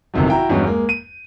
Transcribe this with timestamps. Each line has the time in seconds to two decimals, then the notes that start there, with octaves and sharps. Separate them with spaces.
0.14 G1 F2 C3 D#3 F#3
0.28 E4 F#4 G5 A#5
0.49 E2 G2 F#3 G#3 C#4 E4
0.64 G#3 A#3
0.89 D#7